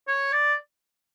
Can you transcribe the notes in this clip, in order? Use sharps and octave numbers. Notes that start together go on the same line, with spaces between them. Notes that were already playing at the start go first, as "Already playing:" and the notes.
C#5
D5